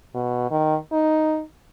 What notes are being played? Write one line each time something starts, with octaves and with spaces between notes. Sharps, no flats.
B2
D#3
D#4